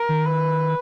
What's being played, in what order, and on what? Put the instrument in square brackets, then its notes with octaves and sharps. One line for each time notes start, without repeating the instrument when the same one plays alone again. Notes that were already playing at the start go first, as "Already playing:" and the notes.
Already playing: [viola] A#4
[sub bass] D#3
[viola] B4